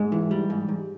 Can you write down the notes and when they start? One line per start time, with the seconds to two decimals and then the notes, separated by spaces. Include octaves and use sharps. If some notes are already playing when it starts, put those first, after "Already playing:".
Already playing: G#2 G#3
0.12 E3
0.31 G3
0.50 G#2
0.68 G#2